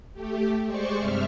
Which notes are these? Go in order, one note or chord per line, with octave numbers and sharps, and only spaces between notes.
A3 G4
G#3 C5 D5 C#6
G2 C3 E5 F6